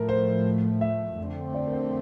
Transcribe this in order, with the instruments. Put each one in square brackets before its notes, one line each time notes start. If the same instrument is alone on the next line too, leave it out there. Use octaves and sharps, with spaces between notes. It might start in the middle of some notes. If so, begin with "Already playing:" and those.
Already playing: [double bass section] A2 F3 A3 [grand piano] A#4
[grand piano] C5
E5
[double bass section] F2 D3 A3 C4
[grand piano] D5
A#4
C5